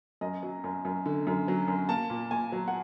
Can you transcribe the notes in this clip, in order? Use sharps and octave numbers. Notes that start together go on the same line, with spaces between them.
F#2 D#5
F#3
F#2
F#2
D3
F#2
F#3
F#2
A#3 A5
A#2
A#2 G#5
F#3
F#5